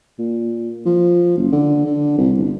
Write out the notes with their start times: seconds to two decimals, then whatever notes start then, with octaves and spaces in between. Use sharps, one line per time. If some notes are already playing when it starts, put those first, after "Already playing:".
0.19 A#2
0.86 F3
1.37 F#1
1.52 D3
1.86 D3
2.18 C2
2.38 G1